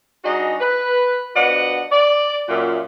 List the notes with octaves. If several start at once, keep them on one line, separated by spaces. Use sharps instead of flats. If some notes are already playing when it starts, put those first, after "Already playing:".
G3 D4 D#4 F#4 G#4 D#5
B4
F3 B3 D4 F#4 D#5 F#5
D5
F#2 A#2